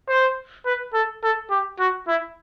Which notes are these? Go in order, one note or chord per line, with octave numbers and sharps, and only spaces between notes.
C5
B4
A4
A4
G4
F#4
E4